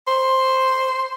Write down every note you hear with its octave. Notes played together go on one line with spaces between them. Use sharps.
C5